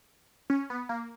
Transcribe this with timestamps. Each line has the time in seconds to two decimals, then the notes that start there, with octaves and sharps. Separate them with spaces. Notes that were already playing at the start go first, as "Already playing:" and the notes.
0.50 C#4
0.70 B3
0.89 A#3